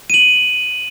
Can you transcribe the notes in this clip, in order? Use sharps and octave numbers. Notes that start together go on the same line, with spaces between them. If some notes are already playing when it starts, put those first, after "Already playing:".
D#7 F#7